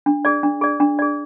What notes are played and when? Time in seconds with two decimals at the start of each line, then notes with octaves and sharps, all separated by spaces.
0.06 D4
0.25 G#4 D5
0.43 D4
0.61 G#4 D5
0.80 D4
0.99 G#4 D5